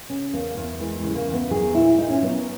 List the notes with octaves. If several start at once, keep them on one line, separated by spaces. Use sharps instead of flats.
C#3 C#4
E2 A#3
E2 A#3
E3 G#3
G#3
C#3
G#3
A#3
E2
B3
F#3 G#4
A#2 E4
A#2 D#4
C#4
F#3 B3